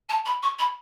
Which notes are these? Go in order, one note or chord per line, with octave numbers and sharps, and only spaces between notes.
A5
B5
C#6
B5